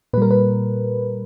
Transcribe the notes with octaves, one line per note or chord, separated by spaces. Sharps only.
A#2 G3 A#4 B4
B4